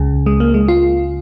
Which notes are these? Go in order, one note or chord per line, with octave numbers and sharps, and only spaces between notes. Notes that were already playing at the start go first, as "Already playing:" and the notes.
Already playing: C#2 C#3
G#3
A#3
G#3
F4